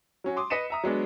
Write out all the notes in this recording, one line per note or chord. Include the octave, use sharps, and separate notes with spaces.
F#3 C#4 F#4
C6 D6 D#6
B4 D#5 B6 C#7 D#7 E7
E5 A#5 D#6
F#3 G#3 B3 D4